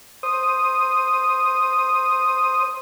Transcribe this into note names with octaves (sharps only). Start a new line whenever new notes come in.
C5 D#6